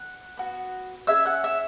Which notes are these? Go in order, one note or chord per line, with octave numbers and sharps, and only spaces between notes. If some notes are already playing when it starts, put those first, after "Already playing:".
Already playing: F#5
B3 F#4
C#4 G#4 E5 E6
F#5 F#6
E5 E6